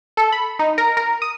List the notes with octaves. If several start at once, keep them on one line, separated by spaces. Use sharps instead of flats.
A4
B5
D#4
A#4
A#4
D#6